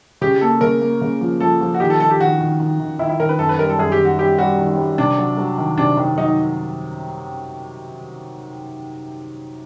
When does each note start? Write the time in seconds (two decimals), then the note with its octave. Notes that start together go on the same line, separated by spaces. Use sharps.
0.21 C#3 G4
0.41 A#3 A4
0.61 C#3 A#4
0.82 A#3
1.01 C#3
1.21 F3
1.40 F3 A4
1.61 F3
1.74 F#4
1.80 D#3 G4
1.90 A4
2.00 D#3 A4
2.11 G4
2.20 D#3 F#4
2.41 D#3
2.60 D#3
2.80 D#3
2.99 D#3 E4
3.09 E4
3.20 D#3 A#4
3.29 B4
3.39 F#2 A4
3.49 B4
3.59 G3 A#4
3.70 A4
3.79 F#2 G#4
3.92 G4
3.98 D#3
4.05 F#4
4.19 G3 G4
4.38 G3 F#4
4.59 D#3
4.78 G3
4.98 C3 D4
5.18 F#3
5.38 F#3
5.58 D#3
5.78 C3 D4
5.97 D#3
6.17 F#3 D#4